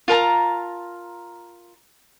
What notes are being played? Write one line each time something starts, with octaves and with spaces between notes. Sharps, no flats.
F4 A#4 A5 A#5